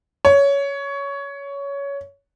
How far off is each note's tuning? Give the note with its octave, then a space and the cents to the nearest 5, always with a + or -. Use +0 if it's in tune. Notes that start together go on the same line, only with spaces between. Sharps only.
C#5 +15